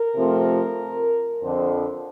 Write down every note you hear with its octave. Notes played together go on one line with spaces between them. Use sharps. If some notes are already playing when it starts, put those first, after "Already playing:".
Already playing: A#4
C3 F3 A3 C4
F2 D3 F3 C5